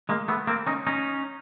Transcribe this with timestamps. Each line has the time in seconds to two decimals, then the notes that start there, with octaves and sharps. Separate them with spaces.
0.09 G#3 A#3
0.28 A3 B3
0.47 A#3 C4
0.67 C#4 D#4
0.87 C#4 D#4